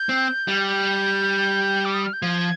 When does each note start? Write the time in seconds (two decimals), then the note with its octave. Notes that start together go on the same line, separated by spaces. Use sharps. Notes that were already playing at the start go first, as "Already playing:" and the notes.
Already playing: G6
0.09 C4
0.48 G3
0.67 G6
1.85 D6
1.94 D#6
2.04 F6
2.13 G6
2.22 F3 G#6